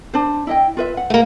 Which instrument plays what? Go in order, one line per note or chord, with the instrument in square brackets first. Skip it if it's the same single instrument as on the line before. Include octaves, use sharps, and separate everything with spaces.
[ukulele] D4 C5
E4 D#5 G5
F4 B4 E5
F#5
[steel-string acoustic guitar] A3 A#3